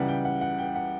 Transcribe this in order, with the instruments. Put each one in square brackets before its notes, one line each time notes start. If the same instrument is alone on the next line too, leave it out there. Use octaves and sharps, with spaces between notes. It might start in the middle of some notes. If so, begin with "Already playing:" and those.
Already playing: [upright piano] C#2 C#3 E3 G3 F#5
G5
F#5
F#5
G5
F#5